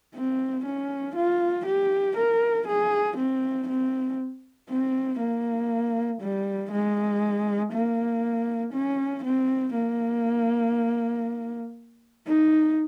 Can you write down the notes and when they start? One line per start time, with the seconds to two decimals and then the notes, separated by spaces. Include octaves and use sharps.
0.15 C4
0.65 C#4
1.16 F4
1.66 G4
2.17 A#4
2.67 G#4
3.17 C4
3.68 C4
4.69 C4
5.19 A#3
6.21 G3
6.71 G#3
7.73 A#3
8.73 C#4
9.24 C4
9.74 A#3
12.27 D#4